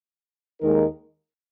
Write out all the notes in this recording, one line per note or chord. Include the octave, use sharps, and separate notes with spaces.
D#2 D#3 G#3 D#4 A#4